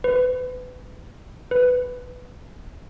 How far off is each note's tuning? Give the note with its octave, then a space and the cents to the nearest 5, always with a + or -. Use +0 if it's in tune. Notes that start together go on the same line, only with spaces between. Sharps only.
B4 +30
B4 +10